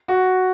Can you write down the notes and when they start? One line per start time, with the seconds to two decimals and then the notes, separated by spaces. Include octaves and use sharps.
0.08 F#4